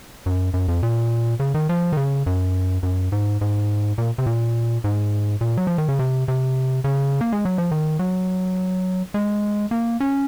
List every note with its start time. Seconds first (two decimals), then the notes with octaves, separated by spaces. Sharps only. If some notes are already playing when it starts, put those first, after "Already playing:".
0.26 F#2
0.54 F#2
0.68 F2
0.83 A#2
1.40 C#3
1.54 D#3
1.69 F3
1.92 D#3
1.97 C#3
2.26 F#2
2.83 F#2
3.12 G#2
3.41 G#2
3.98 A#2
4.18 C3
4.26 A#2
4.84 G#2
5.41 A#2
5.57 F#3
5.67 F3
5.78 D#3
5.89 C#3
5.99 C3
6.28 C3
6.84 C#3
7.21 A#3
7.32 G#3
7.45 F#3
7.58 F3
7.71 D#3
7.99 F#3
9.14 G#3
9.71 A#3
10.00 C#4